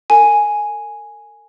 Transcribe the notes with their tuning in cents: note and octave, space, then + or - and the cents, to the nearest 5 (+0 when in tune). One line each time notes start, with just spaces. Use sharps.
A#4 -45 G#5 +0